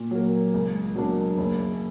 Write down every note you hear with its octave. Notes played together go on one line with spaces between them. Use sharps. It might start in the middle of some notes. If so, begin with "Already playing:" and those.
Already playing: A#2
F#3 A#3
C#2
B2 F#3 A#3 D4
F#1